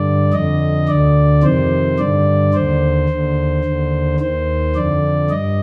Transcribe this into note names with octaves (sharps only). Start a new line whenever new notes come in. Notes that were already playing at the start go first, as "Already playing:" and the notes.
Already playing: G2 D3 D5
F2 D3 D#5
D2 D3 D5
F2 C3 D#3 C5
G2 D3 D5
D#2 D3 C5
D#2 D3
D#2 D3
D#2 D#3 C5
F2 D3 D5
G2 D#5